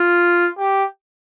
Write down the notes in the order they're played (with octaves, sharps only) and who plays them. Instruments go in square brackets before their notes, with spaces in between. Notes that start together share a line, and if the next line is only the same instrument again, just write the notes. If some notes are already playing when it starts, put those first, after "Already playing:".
Already playing: [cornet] F4
G4